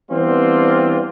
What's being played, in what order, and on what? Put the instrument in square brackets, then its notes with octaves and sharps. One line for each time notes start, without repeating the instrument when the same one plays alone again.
[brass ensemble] E3 G3 B3 C4 D4 F4